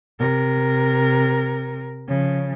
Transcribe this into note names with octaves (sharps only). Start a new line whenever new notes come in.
C3 A#4
C#3 F3